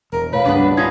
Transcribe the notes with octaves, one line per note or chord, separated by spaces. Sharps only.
E1 A#4
A2 B4 C#5 F5
C#2 G2 G3 B3 D4
C#4 D#4 F4 E5 G#6